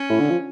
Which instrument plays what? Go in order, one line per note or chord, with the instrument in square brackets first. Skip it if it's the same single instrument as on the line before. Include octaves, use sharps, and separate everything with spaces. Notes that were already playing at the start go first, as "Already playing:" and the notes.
Already playing: [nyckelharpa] C#4
[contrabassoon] A2
D3
F3